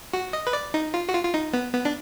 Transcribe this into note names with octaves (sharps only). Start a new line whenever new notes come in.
F#4
D#5
B4
D5
D#4
F4
F#4
F4
F4
D#4
B3
B3
D4